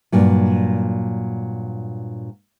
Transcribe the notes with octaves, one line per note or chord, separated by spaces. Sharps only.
G2 A#2 F#3